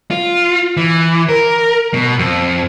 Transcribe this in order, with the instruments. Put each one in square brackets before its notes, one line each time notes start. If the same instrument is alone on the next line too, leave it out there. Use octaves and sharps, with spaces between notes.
[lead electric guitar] F4
E3
A#4
B2
F2